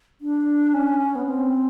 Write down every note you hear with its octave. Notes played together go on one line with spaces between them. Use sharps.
D4
C#4
B3
C4